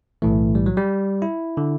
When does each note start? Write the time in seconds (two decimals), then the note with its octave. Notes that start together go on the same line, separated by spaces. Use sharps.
0.22 B1 A2 E3 A3
0.55 G3
0.66 F#3
0.77 G3
1.22 E4
1.57 D3